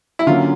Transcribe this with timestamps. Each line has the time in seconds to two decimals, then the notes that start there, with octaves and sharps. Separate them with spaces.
0.19 E4
0.26 D3 F#3 A#3 C#4 F4